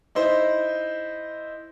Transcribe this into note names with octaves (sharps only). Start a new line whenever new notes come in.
D#4 E4 C5